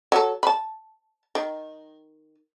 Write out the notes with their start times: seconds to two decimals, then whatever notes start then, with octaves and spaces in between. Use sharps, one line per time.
0.12 F#3 A4
0.43 A5 B5
1.35 D#3